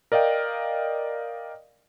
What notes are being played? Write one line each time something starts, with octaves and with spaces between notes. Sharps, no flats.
A#4 D5 D#5 F5 G5